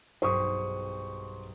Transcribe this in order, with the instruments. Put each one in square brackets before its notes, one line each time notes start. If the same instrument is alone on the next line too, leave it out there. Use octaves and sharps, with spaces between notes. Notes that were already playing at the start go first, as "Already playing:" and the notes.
[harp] B1 G2 G#4 [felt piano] C5 C#6 D#6